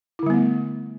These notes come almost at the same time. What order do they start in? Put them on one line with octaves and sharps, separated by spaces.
E4 D3 G3 B3 A3